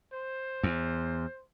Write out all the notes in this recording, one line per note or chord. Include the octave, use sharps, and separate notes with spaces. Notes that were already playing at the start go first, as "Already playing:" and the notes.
C5
E2